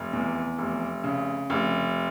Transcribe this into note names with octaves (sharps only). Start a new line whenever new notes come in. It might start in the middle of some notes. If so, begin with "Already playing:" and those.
Already playing: F1
E2
F1
C#3
F1